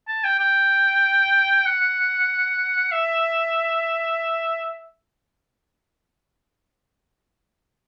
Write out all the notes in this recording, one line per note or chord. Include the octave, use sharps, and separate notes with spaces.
A5
G5
G5
F#5
E5